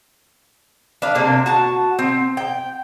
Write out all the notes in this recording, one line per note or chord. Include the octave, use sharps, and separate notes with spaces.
D4 B4 F5
C3 A#3 C4 D4
F#4 A5
C4
G5